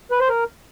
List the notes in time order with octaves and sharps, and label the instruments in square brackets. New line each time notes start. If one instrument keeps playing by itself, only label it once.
[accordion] B4
C5
A#4